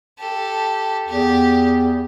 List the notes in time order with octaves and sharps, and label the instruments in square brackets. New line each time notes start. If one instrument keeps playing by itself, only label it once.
[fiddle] G4 A4
[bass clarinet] E2 [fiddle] G4